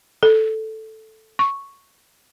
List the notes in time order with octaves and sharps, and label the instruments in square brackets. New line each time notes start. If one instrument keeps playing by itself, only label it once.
[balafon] A4
C#6